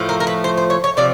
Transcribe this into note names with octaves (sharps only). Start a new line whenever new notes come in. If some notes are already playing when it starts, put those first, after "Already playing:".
Already playing: A2 F3 A3
A#4
A#4
B4
C5
C5
C#5
C#5
C3 F3 D5